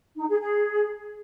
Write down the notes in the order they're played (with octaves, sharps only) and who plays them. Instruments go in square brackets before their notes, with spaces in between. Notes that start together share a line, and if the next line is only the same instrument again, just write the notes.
[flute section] D#4
G#4
G#4